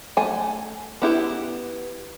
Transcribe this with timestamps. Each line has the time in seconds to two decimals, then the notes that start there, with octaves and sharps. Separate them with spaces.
0.17 A3 G#5
1.02 B3 E4 G4